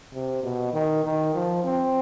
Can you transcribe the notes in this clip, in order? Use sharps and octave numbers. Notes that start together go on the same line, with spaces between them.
C3
B2
D#3
D#3
F3
C4